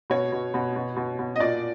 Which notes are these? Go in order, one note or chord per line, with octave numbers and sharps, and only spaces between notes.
B2 C#5
B2
B2
B2
B2
B2
D#5
A#2 D5